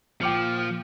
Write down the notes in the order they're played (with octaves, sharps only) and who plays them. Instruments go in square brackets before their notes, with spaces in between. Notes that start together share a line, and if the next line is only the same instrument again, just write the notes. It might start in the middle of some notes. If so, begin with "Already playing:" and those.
[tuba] A#2 [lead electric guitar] F3 [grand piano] G5 D6 C#7 [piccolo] F6